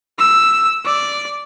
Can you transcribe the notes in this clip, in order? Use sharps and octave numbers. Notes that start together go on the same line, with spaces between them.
E6
D5